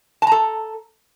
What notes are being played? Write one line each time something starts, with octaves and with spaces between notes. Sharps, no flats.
A4 A5 A#5